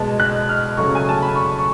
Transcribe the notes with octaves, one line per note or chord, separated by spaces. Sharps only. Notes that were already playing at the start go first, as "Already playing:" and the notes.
Already playing: B2 G#3 B3 A5
F#6
F6
C#3 F#3 A3 C#6
G#5
A5
B5
C#6
C#6